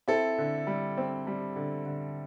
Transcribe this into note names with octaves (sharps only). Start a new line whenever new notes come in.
C4 E4 A4
D3
G3
C4
G3
D3
D3